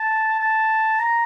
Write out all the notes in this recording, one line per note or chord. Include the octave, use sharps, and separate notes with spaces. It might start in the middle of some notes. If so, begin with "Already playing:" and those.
Already playing: A5
A5
A#5